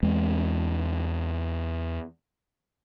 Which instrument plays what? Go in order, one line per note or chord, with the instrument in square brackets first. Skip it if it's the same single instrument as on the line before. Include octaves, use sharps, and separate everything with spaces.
[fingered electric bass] E2 G#3 C4